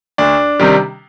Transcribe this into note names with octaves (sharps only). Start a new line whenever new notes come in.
D2 D4
C3 D#3 G3